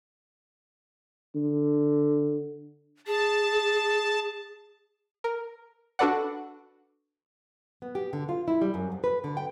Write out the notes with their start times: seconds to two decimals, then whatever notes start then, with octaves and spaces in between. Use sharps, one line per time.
1.35 D3
3.07 G#4 A5
5.24 A#4
5.99 D4 F#4 A4 B4 D5 F#5
7.82 B3
7.95 G4
8.13 D3
8.29 F4
8.48 E4
8.61 G3
8.74 F#2
8.92 F2
9.04 B4
9.24 D3
9.37 G5